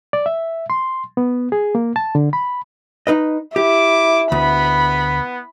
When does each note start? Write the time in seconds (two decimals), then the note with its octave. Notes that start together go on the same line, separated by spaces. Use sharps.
0.13 D5
0.26 E5
0.70 C6
1.17 B3
1.52 G#4
1.75 A#3
1.96 A5
2.15 D3
2.33 B5
3.07 D#4 B4 D#5
3.56 E4 G4 D6
4.32 D2 B3 B5